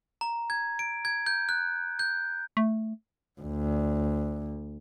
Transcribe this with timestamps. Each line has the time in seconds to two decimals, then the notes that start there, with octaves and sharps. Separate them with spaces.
0.21 A#5
0.50 G#6
0.79 D7
1.05 G#6
1.26 G6
1.49 F#6
1.99 G6
2.57 A3
3.41 D2